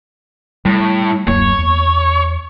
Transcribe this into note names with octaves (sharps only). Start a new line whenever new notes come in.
A2 G3
D1 F#2 A#3 C#5
E2